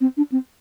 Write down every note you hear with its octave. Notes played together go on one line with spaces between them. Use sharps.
C4
D4
C4